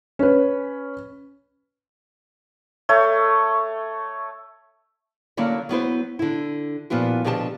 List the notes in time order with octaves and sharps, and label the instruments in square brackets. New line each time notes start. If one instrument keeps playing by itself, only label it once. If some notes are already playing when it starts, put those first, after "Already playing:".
[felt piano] C#4 B4
[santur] A3 C#5
[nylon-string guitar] D3 F#3 A#3 C#4 E4 D5
F#3 B3 E4 C5
D3 E4
A#2 F3 B3 E4 F#4
B2 D3 F3 G4 G#5 A5